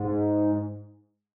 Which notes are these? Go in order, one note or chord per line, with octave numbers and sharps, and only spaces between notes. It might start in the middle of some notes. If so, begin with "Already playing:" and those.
Already playing: G#2